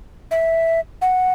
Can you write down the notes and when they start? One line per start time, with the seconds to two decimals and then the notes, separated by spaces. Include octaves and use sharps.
0.31 E5
1.02 F#5